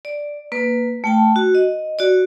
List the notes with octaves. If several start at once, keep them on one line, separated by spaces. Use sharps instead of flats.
D5
A#3 B4
A3 G5 A5
F#4
D#5
F#4 D5